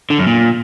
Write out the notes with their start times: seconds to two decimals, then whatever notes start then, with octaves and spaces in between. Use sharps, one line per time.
0.10 D3
0.18 F#2
0.27 A#2